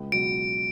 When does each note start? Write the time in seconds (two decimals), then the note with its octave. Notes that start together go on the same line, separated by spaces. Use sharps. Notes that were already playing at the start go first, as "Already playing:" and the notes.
Already playing: C#2
0.12 B2 F#3 D7